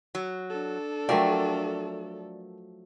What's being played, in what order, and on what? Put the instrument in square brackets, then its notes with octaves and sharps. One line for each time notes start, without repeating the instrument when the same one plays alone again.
[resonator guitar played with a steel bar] F#3
[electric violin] D4 A4
[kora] F3 F#3 A3 [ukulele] A#4 G5 [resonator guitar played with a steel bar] D5